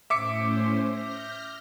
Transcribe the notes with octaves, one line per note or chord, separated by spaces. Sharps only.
A2 C#4 C5 E5 D6 C#7
F6 G6 A#6